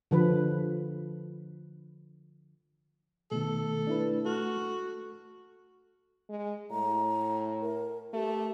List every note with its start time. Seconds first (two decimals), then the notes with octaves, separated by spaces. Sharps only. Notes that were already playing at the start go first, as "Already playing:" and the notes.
0.11 D3 F3 B4
3.31 B2 D#3 A3 A4
3.87 D4 E4 B4
4.25 F#4 A4 F6
6.29 G#3
6.71 A2 A#5
7.62 A#4
8.13 A3 G4